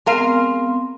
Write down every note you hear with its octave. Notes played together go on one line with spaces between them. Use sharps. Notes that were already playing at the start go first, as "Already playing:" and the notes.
G#3 B3 C4 A#4 F5 C6